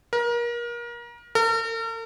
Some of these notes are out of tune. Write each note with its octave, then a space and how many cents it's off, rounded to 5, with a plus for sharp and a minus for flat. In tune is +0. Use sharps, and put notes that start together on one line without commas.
A#4 +30
A#4 -45